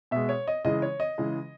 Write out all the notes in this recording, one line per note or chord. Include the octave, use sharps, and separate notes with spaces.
B2 G#3 E5
C#5
D#5
C#3 E3 G#3 D#5
C#5
D#5
C#3 E3 G#3